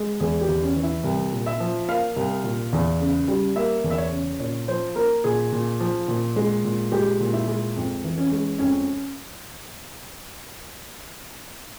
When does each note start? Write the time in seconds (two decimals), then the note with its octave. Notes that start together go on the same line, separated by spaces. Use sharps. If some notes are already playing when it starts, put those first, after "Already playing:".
Already playing: G#3
0.20 E2 G#4
0.41 G4
0.48 E2
0.62 C#4
0.76 E3
0.83 E4
1.04 C2
1.32 A#2
1.46 E5
1.60 F3
1.88 A#3 F5
2.16 C2
2.44 A#2
2.73 E2
3.00 C#3
3.28 G3
3.56 A#3 E5
3.84 E2
3.90 E5
3.98 C#5
4.11 C#3
4.40 A#2 C#5
4.68 F3 C5
4.96 A#3 A#4
5.24 A#2 G#4
5.52 A#2
5.80 F3
6.08 A#2
6.36 G#3
6.64 A#2
6.92 G#3 G4
7.20 A#2
7.33 E4
7.48 G#3
7.76 F2
8.04 E3
8.18 C#4
8.32 G#3
8.59 F2 C#4